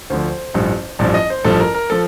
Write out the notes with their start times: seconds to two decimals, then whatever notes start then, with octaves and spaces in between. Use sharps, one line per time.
0.10 D2 D3 F3 C5
0.54 A1 G2 F3
0.99 A1 G2 F3 D5
1.14 D#5
1.30 C5
1.44 A1 G2 F3 A4
1.60 A#4
1.74 A#4
1.90 F3 A4